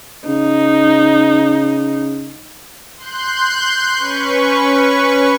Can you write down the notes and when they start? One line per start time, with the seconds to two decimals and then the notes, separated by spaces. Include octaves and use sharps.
0.28 C#3 D#4
2.97 C6 F#6 G6
3.95 C#4 B4 C#6